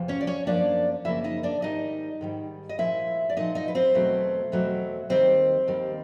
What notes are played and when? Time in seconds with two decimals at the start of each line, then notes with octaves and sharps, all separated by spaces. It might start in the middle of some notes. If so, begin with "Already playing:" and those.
Already playing: E2 C3 F3
0.08 C#4 C#5
0.21 D5
0.27 C#4 C#5
0.46 F#2 C#3 F3 A#3 D4 D5
1.05 F#2 C#3 F3 A#3 E4 E5
1.24 D#4 D#5
1.43 D4 D5
1.62 G#2 D#3 G3 D#4 D#5
2.21 G#2 D#3 G3
2.69 D#5
2.78 A#2 F3 G#3 E4 E5
3.29 D5
3.37 A#2 F3 G#3 D#4 D#5
3.55 D#4 D#5
3.68 B4
3.75 C4 C5
3.94 E2 B2 F#3 A3 C4
4.52 E2 B2 F#3 A3 C4
5.09 D#2 D#3 G3 C4 C5
5.67 D#2 D#3 G3